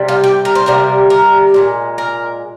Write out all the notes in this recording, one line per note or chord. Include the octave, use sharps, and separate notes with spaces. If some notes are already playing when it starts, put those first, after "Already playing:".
Already playing: C3 G3
F4
G4
A#4
C5
C3 G3 A#3 A#4
A#4
A#2 F3 G#3
A#4